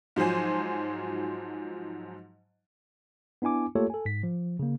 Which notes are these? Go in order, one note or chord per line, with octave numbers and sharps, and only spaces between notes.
G#2 F3 F#3 C5 G#5
B3 D4 E4 G#5 D6
A3 A#3 F4 G4 A4 C#5
A4 G#5
G#2 B6
F3
C#3 A#3